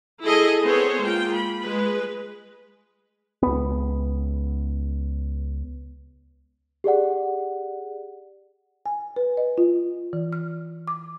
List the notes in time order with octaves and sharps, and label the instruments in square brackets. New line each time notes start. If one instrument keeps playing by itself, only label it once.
[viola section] E4 G#4 A4 D#5
B3 C4 G#4 C5 C#5
G#3 A#3 F4 G5
B5
G#3 B4
[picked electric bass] C#2 B3
[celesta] G4 G#4 D5 F#5
[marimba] G#5
B4
D#5
F4
E3
F6
D6